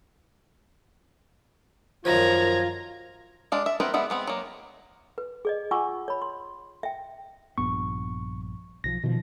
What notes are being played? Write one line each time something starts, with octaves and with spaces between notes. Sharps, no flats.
F#2 D#3 F3 F4 A#5 G#6
G#3 D4 F5
E5
B3 C4 E4 A#4 B4
G3 G#3 B3 E5
G#3 B3 C4
F#3 A#3
B4
G#4 D5 D#5
F4 F#5 G#5 C#6 D6 E6
C#5 B5
C6
E5 G5
A#1 G2 B3 C#6
B1 E3 F3 A#6
B2 D#3 F3